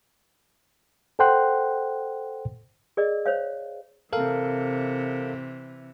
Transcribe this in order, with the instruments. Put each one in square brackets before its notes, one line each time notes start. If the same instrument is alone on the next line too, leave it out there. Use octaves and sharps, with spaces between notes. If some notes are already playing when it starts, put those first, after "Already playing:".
[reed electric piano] A4 C5 F#5 G5 C6 F#6
[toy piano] G#4 A#4 D5 D#5
C5 C#5 F5
[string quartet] C3 E3 [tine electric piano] A4 A#4 F5